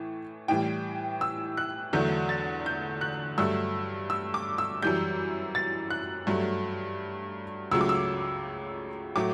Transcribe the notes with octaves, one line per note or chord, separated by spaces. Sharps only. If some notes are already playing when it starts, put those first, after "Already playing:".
Already playing: A2 E3 A3
A2 E3 G3 G5
E6
F#6
E2 D3 F#3 A3 G6
A6
G6
F#6
G2 F#3 A3 E6
E6
D6
E6
F#2 E3 G3 G6
A6
F#6
G2 F#3 A3
C#2 C#3 F#3 A3 E6
D6
E6
A2 F#3 A3 D6